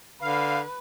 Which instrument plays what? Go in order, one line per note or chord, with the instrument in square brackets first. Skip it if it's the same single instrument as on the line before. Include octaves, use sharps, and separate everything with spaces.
[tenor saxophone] D3 [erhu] B4 [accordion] F5